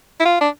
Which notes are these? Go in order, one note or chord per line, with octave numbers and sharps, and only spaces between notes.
E4
F4
D4